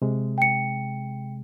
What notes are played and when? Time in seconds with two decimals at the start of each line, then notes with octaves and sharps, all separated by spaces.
0.02 C3 G#3
0.38 G5 C#7